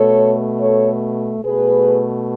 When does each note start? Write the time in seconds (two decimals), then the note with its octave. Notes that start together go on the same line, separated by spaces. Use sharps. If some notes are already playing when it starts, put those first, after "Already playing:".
Already playing: B2 A3 A4 C#5
0.60 A4 C#5
1.44 B2 A3 G#4 B4